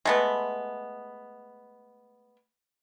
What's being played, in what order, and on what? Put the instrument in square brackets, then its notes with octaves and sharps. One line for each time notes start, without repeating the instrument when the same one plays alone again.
[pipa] G#3 A3 B3